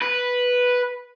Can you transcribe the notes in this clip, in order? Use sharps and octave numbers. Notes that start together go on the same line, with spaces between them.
B4